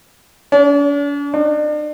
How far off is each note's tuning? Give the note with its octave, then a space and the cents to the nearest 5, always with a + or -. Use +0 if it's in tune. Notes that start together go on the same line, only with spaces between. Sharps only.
D4 -45
D4 +40